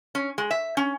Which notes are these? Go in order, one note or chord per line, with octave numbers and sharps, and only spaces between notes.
C#4
G#3
E5
C#4